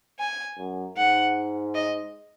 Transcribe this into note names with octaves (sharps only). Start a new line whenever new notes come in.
G#5
F#2
G#2 F#5
D#5